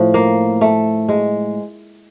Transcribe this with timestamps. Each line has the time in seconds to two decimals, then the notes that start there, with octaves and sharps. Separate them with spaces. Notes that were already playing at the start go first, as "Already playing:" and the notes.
Already playing: A2 F3
0.14 A#3
0.61 A3
1.09 G#3